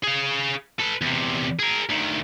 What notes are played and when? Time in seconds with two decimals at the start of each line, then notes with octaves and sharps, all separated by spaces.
0.03 G#4 F5
0.80 A4 B4
1.01 E2 C3
1.59 G#4 A#4
1.89 D2 D#3